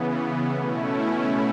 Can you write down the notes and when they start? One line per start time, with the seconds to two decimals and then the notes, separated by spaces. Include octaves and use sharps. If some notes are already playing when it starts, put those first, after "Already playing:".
Already playing: C#3 E3 B3
0.52 B2 A3 C#4 E4